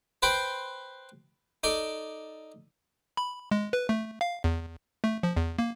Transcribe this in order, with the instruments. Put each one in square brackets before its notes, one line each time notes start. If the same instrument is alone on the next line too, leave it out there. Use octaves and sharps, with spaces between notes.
[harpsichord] B4 C5 G5 B5 C6
D#4 A4 D5
[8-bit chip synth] B5
G#3
B4
A3
F5
E2
A3
F3
E2
A#3